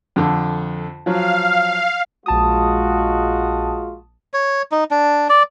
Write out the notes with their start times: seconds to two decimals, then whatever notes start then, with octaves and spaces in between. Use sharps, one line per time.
0.16 F2 D3
1.06 F3 F#3 F5
2.26 A#1 G#3 F4 F#4 A5 D#6
4.34 C#5
4.72 D#4
4.91 D4
5.29 D5